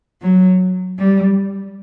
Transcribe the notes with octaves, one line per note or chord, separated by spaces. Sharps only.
F#3
G3